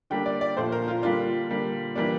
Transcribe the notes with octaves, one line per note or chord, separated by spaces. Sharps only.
D3 G3 A#3 D4 G5
D5
D5
A#2 F3 A3 C5
A#4
F4
D3 G3 A#3 D4 F4
D3 G3 A#3
E3 G3 A#3 D4